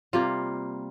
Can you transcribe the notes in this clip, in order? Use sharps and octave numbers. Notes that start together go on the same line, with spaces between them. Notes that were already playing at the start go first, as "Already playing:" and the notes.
C3 G3 A#3 F4 F5